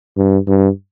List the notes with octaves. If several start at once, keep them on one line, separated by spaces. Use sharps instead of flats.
G2
G2